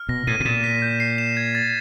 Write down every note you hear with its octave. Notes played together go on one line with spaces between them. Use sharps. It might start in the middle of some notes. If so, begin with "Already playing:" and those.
Already playing: F6
B2 A#6
A2 D#7
B2
A#2 E7
B6
G6
C7
E7
G#6
A6